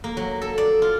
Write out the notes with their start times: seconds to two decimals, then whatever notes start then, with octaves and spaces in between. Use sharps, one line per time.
0.04 A#3
0.17 F#3
0.42 A4
0.58 D5
0.82 F4